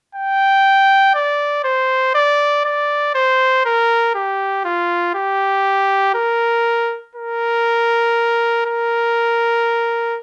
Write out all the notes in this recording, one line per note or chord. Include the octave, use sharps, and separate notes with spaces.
G5
D5
C5
D5
D5
C5
A#4
G4
F4
G4
A#4
A#4
A#4